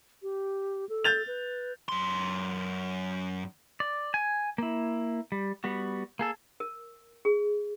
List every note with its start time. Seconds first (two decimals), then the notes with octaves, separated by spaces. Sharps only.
0.23 G4
0.89 A4
1.04 G6 A6 F7
1.27 B4
1.89 F#2 C6
3.80 D5
4.14 G#5
4.58 A#3 E4
5.32 G3
5.64 G3 B3 F#4
6.19 A#3 G#4 A4
6.60 A#4
7.25 G#4